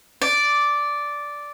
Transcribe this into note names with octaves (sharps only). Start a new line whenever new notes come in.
D5